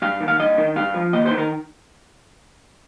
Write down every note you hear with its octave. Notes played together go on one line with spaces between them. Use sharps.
G2 F5
D#3
F5
G2 D#5
D#3
G2 F5
F3
D#2 D#5
C5
D#3
A#4